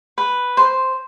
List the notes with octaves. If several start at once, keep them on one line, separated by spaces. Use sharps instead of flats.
B4
C5